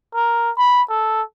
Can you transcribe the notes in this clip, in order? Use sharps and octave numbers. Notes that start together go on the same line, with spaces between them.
A#4
B5
A4